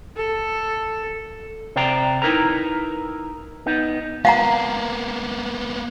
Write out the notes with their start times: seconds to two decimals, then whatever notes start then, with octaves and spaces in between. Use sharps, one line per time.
0.17 A4
1.76 C3 C5 D5 G5 A#5
2.22 D#4 E4 A#4 B4 A#5
3.66 B3 D#4
4.25 A#3 B3 F5 F#5 A#5